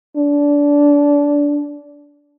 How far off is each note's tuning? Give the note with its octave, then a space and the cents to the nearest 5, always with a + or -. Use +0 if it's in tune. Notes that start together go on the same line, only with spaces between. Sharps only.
D4 -20